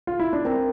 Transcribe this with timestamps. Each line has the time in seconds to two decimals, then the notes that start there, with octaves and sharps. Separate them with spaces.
0.07 F4
0.20 E4
0.33 D4
0.45 C4 A#4